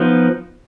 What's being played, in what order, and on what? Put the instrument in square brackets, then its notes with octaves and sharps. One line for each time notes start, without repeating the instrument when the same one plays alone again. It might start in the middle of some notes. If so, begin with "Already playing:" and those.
Already playing: [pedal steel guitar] F3 B3 D#4